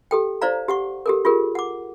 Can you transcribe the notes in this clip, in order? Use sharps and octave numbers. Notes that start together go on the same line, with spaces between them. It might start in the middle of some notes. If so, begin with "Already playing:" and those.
G4 A4 G5
E4 C5 D5 F5 A#5
G4 F#5 C#6
G4 A4 A#4
F4 G4 G#4 A#4
F#5 D6